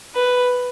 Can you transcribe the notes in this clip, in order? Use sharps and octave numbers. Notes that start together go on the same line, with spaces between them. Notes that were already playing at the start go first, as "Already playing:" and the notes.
B4